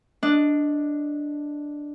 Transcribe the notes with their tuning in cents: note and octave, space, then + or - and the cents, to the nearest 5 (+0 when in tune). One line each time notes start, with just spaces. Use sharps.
D4 +0 D#5 +0